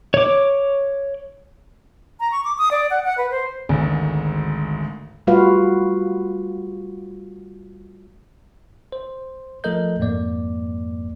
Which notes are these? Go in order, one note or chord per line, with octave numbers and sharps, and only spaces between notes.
C#5 D6
A#5
C#6
D6
D#6
D5
F#5
F#5
B4
C5
G#1 D2 G#2
G3 A3 F4 F#4 B4 F5
C5
F3 A3 A4 A#4 D#5 G6
F2 G#2 A#3 D5